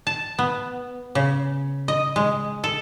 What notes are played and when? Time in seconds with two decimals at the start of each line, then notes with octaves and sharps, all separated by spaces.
0.07 A5
0.39 B3
1.15 C#3
1.88 D#5
2.16 G#3
2.64 A4